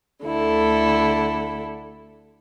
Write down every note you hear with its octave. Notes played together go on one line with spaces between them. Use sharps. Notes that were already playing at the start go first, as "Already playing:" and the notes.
D2 D3 E4 A4